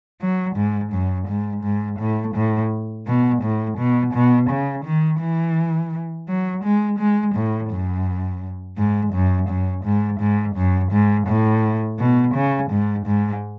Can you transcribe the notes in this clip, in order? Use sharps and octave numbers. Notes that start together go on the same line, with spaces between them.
F#3
G#2
F#2
G#2
G#2
A2
A2
B2
A2
B2
B2
C#3
D#3
E3
F#3
G#3
G#3
A2
F#2
G#2
F#2
F#2
G#2
G#2
F#2
G#2
A2
B2
C#3
G#2
G#2